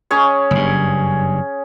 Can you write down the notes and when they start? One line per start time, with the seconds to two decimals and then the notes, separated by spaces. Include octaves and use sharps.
0.11 C#4 G#4 C#5
0.51 F#1 G2